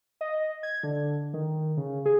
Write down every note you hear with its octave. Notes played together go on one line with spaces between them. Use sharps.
D#5
G#6
D3
D#3
C#3
G#4